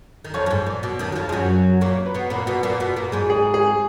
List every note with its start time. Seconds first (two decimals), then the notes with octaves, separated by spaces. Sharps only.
0.24 D#3
0.34 F2 F3 C#5
0.46 F#2
0.51 G#2
0.66 A#2
0.83 B2
0.99 D#2 D#3
1.12 F#3
1.16 F2 F3
1.29 G#3
1.32 F#2 F#3
1.81 A#2 A#3 C#5
2.06 B4
2.15 B2 B3
2.30 A#2 A#3 B4
2.47 B2 B3
2.63 A#2 A#3
2.80 B2 B3
2.96 A#2 A#3
3.12 G#2 G#3
3.30 G#4
3.54 G#4